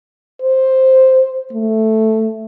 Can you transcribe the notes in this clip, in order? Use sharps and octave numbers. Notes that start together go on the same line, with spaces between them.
C5
A3